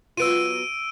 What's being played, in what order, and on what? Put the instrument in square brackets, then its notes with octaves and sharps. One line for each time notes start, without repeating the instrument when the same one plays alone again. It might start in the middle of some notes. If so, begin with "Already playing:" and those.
[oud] F#3 B3 F4 [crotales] E6 D7 D#7